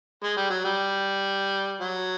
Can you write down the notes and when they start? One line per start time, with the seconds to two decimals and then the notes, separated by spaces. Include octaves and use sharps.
0.23 G#3
0.37 G3
0.50 F#3
0.65 G3
1.81 F#3